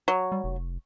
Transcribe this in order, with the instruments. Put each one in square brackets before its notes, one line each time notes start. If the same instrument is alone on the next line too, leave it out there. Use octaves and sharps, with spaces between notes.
[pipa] F#3
[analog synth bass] G3
F1